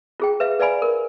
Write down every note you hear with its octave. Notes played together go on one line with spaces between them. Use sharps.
F4 G#4 G5
B4 E5 F5
B4 D5 F5 G#5 B5
A#4